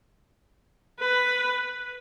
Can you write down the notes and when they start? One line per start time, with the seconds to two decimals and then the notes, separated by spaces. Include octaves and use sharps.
1.00 B4